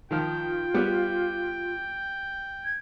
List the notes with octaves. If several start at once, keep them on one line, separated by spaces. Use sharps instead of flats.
D#3 F3 F4 G5 F6
G3 B3 G4
G#6